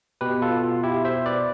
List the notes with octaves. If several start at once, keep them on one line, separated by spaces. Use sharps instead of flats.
B2 G4 B4
F4 A4
F4
E4 G4
C5 E5
B4 D5